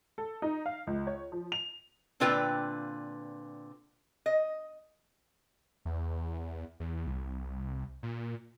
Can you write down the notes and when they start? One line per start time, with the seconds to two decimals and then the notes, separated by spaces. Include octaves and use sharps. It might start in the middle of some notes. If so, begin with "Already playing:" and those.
0.18 A4
0.42 D#4
0.66 F5
0.87 C#2
1.07 C#5
1.32 F3
1.52 F7
2.20 A#2 D3 C4 F4 B4 G5
4.26 D#5
5.85 E2
6.80 E2
7.07 C2
8.03 A#2